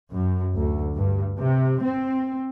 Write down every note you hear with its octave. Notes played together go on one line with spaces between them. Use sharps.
F#2
D2
G2
C3
C4